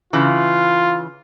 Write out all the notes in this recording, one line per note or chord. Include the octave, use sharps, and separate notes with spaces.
C#3 E3 F4